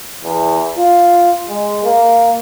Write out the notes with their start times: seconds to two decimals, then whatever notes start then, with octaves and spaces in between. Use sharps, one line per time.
0.24 E2
0.77 F4
1.49 G#3
1.84 A#3